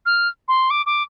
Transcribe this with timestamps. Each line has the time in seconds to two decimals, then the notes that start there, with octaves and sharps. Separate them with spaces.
0.06 F6
0.48 C6
0.70 D6
0.86 D6